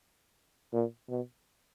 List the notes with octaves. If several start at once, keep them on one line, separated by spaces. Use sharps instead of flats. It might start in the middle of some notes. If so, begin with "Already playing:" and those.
A#2
B2